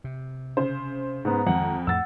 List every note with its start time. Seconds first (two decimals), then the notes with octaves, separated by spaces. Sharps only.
0.04 C3
0.57 C#3 C5
1.25 G#2 B3 A#5
1.47 F2 D#3 G#3 F#5
1.87 F2 A2 A3 F#5 E6 A6